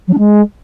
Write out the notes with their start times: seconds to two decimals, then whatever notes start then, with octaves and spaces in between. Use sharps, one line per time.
0.08 F#3
0.13 D4
0.18 G#3